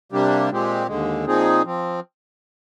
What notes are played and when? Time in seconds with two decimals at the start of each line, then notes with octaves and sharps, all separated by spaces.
0.12 C3 G3 A#3 D4 G4
0.50 A#2 G#3 C4 G4
0.87 D#2 D3 G#3
1.25 A#2 F3 C4 D#4 G#4
1.64 F3 C4